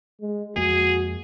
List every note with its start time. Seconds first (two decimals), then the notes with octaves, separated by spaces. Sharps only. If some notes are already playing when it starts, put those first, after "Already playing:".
0.21 G#3
0.56 F2 G#3 A#3 F#4 G#4